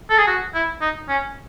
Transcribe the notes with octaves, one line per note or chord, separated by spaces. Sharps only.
A4
G#4
F#4
E4
D#4
C#4